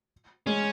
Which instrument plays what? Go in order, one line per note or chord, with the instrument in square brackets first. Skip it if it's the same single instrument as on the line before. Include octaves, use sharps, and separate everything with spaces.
[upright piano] G#3 [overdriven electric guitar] C#4